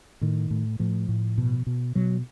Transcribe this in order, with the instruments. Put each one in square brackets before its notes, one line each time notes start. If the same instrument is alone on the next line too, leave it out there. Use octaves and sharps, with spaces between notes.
[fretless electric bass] A2 D#3
A2
A2 F3
A2
B2
B2
B2 F#3